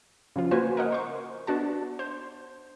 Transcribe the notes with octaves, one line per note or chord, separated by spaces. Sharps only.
C#3 F3 F4
A#3 F#4 B4 C5 G#5
A#4 D#5 F#5
C5 C#6
B3 D4 F#4 A5
C5